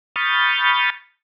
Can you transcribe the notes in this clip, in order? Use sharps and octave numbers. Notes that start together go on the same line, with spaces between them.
B5 C#6 D#6 F6 G6 A6